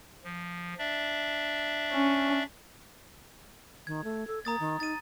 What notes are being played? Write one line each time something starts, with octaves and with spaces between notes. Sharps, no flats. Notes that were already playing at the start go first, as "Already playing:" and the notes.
F3
D4 D5 E5
C#4
D#3 G#6
A3
A4
A#3 A#5 D#6 A6
D#3
D#4 A6 D#7